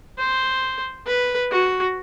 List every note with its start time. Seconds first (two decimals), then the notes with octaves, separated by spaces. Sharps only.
0.18 C5
1.07 B4
1.51 F#4